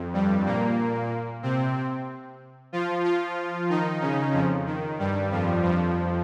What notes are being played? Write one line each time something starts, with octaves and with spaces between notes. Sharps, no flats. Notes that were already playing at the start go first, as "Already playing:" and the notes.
Already playing: F2
G2 G3
A#2 A#3
C3 C4
F3 F4
F3 F4
D#3 D#4
C#3 C#4
F2 F3
D#3
G2 G3
F2 F3
F2 F3